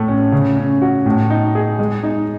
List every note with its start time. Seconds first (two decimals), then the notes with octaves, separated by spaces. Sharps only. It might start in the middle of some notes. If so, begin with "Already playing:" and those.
Already playing: A2 A3
0.08 C#4
0.32 C#3
0.57 C#4
0.82 F#4
1.06 A2
1.30 D#4
1.55 G#4
1.79 G#3
2.03 D#4